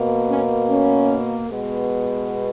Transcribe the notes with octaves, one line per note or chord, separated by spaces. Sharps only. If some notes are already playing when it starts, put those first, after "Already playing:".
Already playing: B2 A#3
C#4
C#4
B2 G#3 B3